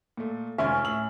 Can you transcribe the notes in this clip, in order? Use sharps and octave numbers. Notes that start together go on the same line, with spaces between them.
A#2 A3
F1 C#2 C#4 E5 G#5
A2 E6 F#7